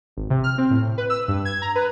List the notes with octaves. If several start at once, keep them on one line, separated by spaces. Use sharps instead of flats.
G#1
C3
F6
C4
A2
B4
E6
G2
G#6
A#5
B4